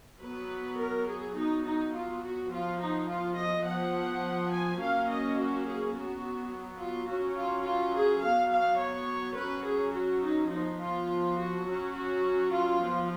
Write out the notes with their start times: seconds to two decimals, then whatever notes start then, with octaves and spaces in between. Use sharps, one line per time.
0.21 F#3 B3 B4
0.77 A#4
1.07 G#4
1.35 F#3 B3 D#4
1.64 D#4
1.92 F4
2.21 F#4
2.49 F3 B3 F4
2.78 D#4
3.06 F4
3.35 D#5
3.64 F3 B3 F#5
4.50 G#5
4.78 F#3 A#3 C#4 F5
5.07 D#5
5.36 F#4
5.65 G#4
5.92 F#3 B3 F#4
6.79 F4
7.07 F#3 C#4 F#4
7.36 F4
7.64 F4
7.94 G#4
8.22 F#3 B3 F5
8.51 F5
8.79 C#5
9.36 F#3 C#4 B4
9.65 G#4
9.94 F#4
10.22 D#4
10.50 F3 B3 D#4
10.79 F4
11.37 F#4
11.65 F#3 C#4
11.93 F#4
12.51 F4
12.79 F3 B3